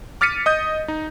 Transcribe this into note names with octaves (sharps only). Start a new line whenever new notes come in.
D6 F6 A6 B6 C#7 D#7
D#5 D#6 G6
D#4